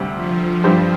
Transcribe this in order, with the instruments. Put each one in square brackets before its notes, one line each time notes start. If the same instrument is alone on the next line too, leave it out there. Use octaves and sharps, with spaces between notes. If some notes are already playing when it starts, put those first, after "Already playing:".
Already playing: [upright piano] D2 C3 G3 C4
[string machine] F3
[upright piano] G2 G3 C4 G4 C5